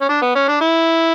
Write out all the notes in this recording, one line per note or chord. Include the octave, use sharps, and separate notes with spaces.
C#4
D4
B3
C#4
D4
E4